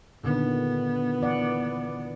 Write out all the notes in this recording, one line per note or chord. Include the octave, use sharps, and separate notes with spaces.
A#2 D3 D#3 B3
E3 D5 F#5